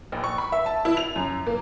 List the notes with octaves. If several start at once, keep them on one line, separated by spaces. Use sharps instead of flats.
A#1
C#6
B5
E5
A5
E4
F7
F#2
A#3